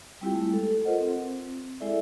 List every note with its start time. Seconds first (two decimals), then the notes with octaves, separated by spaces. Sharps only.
0.21 G3 C4 E4 F4 G4 G5
0.34 G#3 A3 E4
0.53 A4
0.85 F4 A4 A#4 C5 D#5 F#5
1.00 C4
1.80 G#3 E4 G#4 A4 D5 E5